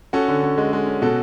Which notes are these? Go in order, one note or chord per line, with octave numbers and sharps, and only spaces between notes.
C#4 F#4 A4
D3
C#4
G#3
G#3
C#4
B2 F#4 A4